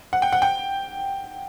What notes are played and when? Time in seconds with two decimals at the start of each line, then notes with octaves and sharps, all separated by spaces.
0.13 F#5
0.22 G5
0.32 F#5
0.42 G5